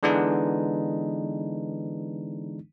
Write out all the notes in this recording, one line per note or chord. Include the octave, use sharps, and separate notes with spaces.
D3 E3 G#3 B3 D4 D#4